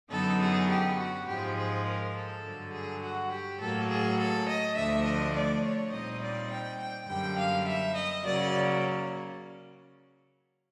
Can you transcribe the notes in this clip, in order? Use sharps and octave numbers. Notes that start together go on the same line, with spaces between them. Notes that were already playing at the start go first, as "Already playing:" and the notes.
F#2 D3 F#3 B3 D#4 A4
G#4
G4
F#4
G#2 F3 G#3 G4
G#4
A#4
A4
G2 D3 F#3
G#4
F#4
G4
A2 F#3 A#3 A4
G#4
A4
D#5
D2 D3 F3 A3 D4 E5
D#5
D5
C#5
A#2 G3 C4 D#4 D#5
D5
G5
G5
F#2 D3 G3 A#3 G5
F5
E5
D#5
C#3 F#3 A#3 D5